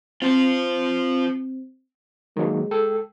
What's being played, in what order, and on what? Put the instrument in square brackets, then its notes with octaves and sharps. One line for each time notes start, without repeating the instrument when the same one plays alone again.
[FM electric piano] C4 [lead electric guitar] F4 C5
[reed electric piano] D#3 F#3 A#3 [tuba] G#3
[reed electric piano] A4 G5 E6